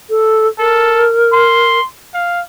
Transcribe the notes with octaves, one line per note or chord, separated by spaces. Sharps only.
A4
A4 A#4
C6
F5